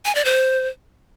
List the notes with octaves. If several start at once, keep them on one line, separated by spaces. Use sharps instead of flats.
G#5
D5
C5